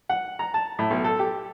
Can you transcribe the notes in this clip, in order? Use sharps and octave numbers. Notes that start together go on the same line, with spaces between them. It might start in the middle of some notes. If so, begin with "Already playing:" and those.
F#5
A#5
A5
A2
B1
A4
G4